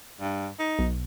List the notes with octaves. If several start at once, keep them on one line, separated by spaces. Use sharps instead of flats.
G2
D#4
B1